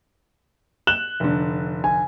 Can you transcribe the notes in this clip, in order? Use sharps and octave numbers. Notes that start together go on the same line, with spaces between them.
F#6 E7 F#7 G7
F1 D3
G#5